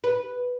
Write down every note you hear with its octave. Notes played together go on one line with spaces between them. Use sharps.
B4